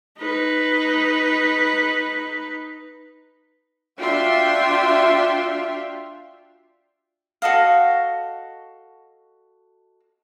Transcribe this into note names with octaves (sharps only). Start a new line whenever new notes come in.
D#4 B4
D4 F4 F#4 E5 G5 C6
F#4 A4 D#5 F5